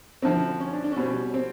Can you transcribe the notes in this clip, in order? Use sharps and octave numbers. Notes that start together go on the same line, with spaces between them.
F#2 D3 F3 C4
C#4
D4
D4
C#4
B2 G3 C4
C#4
C4